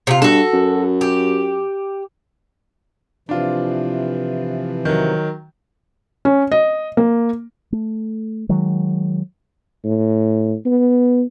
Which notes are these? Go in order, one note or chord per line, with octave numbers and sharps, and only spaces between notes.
C3 F4
G2 F#4 A4
F#2
G4
C3 E3 F3 D4 F4
D#3 F#3
C#4
D#5
A#3
A3
D#3 F#3 G#3
A2
B3